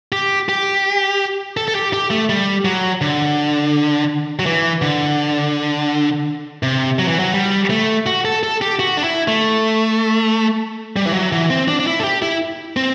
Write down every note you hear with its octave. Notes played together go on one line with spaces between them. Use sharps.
G4
G4
A4
A4
G4
G4
A3
G3
F#3
D3
F#3
E3
D3
C3
F#3
E3
F#3
G3
A3
F#4
A4
A4
G4
F#4
D4
E4
A3
G3
E3
F#3
E3
C4
D4
D4
E4
A4
G4
E4
C4